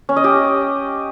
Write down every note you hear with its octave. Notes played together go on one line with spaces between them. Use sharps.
C#4
D#5
G4